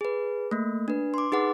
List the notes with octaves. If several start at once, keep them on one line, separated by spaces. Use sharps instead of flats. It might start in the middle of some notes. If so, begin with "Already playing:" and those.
G#4 B4
A3 A#3
D4 B4
C6 D6
D#4 G#4 B4 F#5 D6